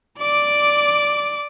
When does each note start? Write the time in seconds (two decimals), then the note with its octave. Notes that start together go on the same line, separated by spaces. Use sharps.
0.19 D5 D6